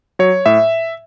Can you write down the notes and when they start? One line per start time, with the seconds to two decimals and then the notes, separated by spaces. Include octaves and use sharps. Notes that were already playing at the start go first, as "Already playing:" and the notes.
0.19 F#3 C#5
0.46 A2 E5